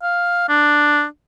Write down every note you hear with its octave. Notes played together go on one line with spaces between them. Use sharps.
F5
D4